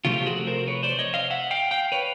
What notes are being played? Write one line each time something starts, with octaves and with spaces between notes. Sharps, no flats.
C3 F3 A3 C4 F4 G4
F#4 G#4
A#4 C5
B4 C#5
C5 D5
C#5 D#5
D#5 F5
E5 F#5
F5 G5
F5 G5
B4 C#5